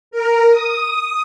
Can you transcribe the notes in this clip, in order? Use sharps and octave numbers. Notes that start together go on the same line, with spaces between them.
A#4
D#6